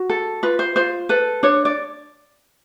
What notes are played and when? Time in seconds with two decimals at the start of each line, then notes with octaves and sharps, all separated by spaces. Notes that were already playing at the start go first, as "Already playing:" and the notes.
Already playing: F#4
0.09 A4
0.43 F4 B4
0.59 C5
0.76 F4 C5
1.09 A4 B4
1.43 D4 C#5
1.65 D5